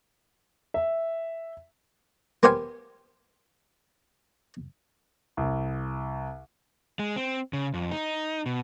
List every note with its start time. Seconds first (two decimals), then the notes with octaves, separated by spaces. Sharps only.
0.74 E5
2.43 A#3 B3 G4 C5 F5 G#5
5.37 C2
6.99 G#3
7.16 C4
7.53 C#3
7.74 F2
7.91 D#4
8.46 B2